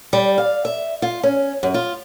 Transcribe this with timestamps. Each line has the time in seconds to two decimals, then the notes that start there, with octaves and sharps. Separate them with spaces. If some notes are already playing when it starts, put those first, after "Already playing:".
0.13 G3
0.38 F5
0.65 E5
1.02 F4
1.23 C#4
1.63 F#2
1.74 F4